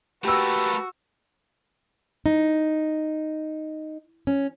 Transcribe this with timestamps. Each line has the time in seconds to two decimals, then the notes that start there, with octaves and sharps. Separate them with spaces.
0.24 A3 A#3 F#4 G4 B4 E6
2.26 D#4
4.27 C#4